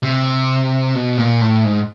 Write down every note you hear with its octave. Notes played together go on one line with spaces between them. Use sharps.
C3
B2
A#2
A2
G#2